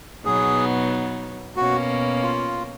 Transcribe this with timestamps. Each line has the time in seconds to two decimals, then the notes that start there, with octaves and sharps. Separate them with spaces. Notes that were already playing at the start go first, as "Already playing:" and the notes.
0.25 B2 F#3 B3 D#4 G#4
1.57 B2 A#3 C#4 F#4
2.23 F4